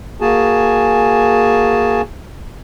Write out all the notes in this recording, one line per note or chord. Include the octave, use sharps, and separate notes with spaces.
A#3 F#4 G#4 G#5 A5